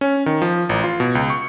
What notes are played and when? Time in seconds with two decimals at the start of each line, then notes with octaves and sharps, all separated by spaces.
0.01 C#4
0.26 D#3
0.42 F3
0.69 A1
0.84 F4
1.00 B2
1.15 C#2
1.30 C#6